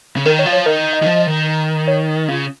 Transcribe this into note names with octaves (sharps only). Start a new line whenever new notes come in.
C#3
D#3 A#4
C#5
F3
C#5
D#3 A#4
D#5
D#3
F3
D#3
C#5
C#3 F4